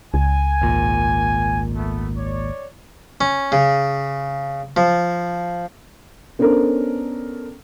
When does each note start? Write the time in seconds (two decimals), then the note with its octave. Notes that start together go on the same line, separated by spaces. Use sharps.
0.14 C#2 G#5
0.61 G#1 A#2
1.76 A3 B3
2.18 C#5 D5
3.21 C#4
3.52 C#3
4.77 F3
6.39 B3 C#4 D4 A4 A#4 C5